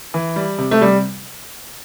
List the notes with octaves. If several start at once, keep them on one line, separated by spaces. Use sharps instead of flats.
E3
G3
C3
A3
C3 G3